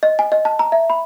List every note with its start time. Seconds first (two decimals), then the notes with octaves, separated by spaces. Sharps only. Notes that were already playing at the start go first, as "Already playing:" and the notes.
0.03 D#5
0.19 G#5
0.32 D#5
0.45 A5
0.59 A#5
0.72 E5
0.90 B5